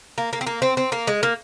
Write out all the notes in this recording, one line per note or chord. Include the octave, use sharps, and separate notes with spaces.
A#3
A#3
C4
A#3
C4
C4
A#3
G#3
A#3